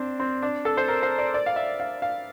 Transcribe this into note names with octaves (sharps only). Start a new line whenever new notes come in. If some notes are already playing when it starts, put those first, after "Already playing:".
Already playing: C4 D4
C4
D4
A4
C5
A#4
C5
D5
D5
F5
E5
F5
F5